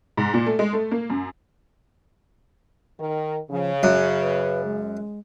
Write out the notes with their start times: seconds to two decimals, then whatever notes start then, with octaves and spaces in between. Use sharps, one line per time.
0.17 G#2
0.34 A#2
0.46 A3
0.59 G#3
0.73 A3
0.91 A#3
1.10 F#2
2.99 D#3 A#4
3.51 C#3 F3
3.83 F#2 C#5
4.21 B4
4.65 G#3